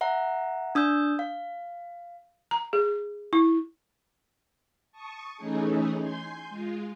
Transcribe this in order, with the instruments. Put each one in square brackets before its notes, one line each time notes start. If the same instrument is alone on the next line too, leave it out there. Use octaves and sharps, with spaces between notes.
[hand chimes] E5 F#5 A#5
D4 D#6 E6 G6
F5
[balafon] A#5
G#4
E4
[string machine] A5 C#6 D#6
E3 A3 C#4 D#4 G#4
G#5 C6 G6
G#3 F4